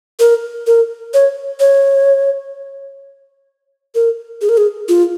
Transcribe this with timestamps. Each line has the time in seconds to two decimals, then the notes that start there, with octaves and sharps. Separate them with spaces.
0.19 A#4
0.67 A#4
1.14 C#5
1.60 C#5
3.95 A#4
4.41 G#4
4.49 A#4
4.57 G#4
4.88 F4